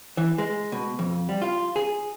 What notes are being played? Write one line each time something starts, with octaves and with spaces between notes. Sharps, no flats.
E3
G#3
B2
F2
G3
F4
G#4